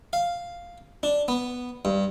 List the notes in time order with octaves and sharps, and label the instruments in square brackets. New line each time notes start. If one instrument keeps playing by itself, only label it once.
[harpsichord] F5
D4
B3
G2